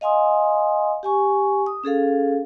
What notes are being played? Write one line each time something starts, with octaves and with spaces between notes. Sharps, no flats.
D#5 F5 G#5 C6 D#6
G4 G#5 C#6
D#6
C#4 G#4 A4 F5